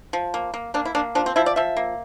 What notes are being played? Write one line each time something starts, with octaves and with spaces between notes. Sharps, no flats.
F3
A#3
A#3
A#3 D4
E4
A#3 D4
F3 D4
C4
F3 E4
D5
F3 E5
A#3